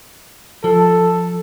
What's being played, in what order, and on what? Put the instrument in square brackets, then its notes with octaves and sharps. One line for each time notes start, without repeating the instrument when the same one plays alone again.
[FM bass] F3 [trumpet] A4